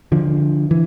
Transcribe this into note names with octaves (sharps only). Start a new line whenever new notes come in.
D3 F3
E3